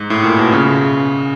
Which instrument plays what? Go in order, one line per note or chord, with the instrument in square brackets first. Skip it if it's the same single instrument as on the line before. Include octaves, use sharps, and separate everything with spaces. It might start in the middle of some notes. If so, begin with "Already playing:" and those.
Already playing: [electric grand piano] G#2
A2
A#2
B2
C#3